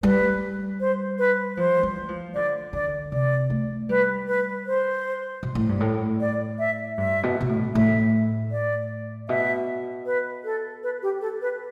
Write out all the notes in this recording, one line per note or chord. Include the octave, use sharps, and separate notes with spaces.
G3 B4
C5
B4
F3 C5
G3
F3
D3 D5
D3 D5
C3 D5
A3
G3 B4
B4
C5
B2
A2
G2
A2
D5
E5
G2 E5
B2
B2
A2
A2 E5
D5
B2 E5
B4
A4
B4
G4
A4
B4